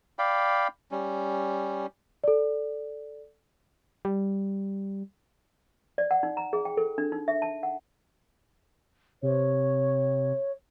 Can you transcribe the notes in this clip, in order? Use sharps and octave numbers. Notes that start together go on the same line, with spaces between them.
D5 F5 G5 B5
G3 C#4
A4 D5
G3
D5
F#5
D#4
A#5
G#4
G5
A4
D4
D#4
E5
A5
F#5
C3 C#5